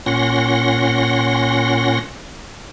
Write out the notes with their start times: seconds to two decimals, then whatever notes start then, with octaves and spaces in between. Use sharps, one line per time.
0.06 A#2 C#4 F#5 C6 A#6